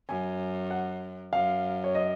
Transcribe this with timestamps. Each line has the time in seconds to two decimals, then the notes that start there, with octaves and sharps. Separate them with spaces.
0.08 F#2 G#5
0.71 F#5
1.33 F#2 F5
1.84 C#5
1.95 D#5